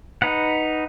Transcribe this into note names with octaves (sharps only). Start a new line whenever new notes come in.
D#4 B4 F#5